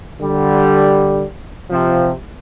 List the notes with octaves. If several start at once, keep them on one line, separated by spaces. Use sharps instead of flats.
D3 G3
C3 F3